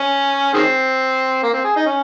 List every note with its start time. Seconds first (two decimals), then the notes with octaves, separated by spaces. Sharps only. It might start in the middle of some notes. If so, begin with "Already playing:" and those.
Already playing: C#4
0.54 D#3 G#3 C4
1.43 A#3
1.54 C4
1.65 G#4
1.76 D#4
1.86 C#4